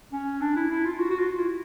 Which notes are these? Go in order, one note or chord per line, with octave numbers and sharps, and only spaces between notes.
C#4
D4
E4
E4
F4
F#4
F#4
F4
E4